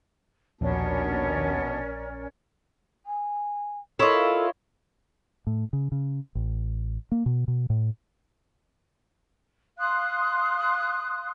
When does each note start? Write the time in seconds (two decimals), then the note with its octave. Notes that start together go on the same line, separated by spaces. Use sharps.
0.61 A#1 D#2 B2 B3 C#4 D4 A#4 D5
3.06 G#5
3.99 E4 F4 A4 A#4 C#5 D#5
5.47 A2
5.73 C#3
5.92 C#3
6.35 A1
7.12 A#3
7.26 B2
7.48 B2
7.70 A2
9.79 F5 C6 D#6 F#6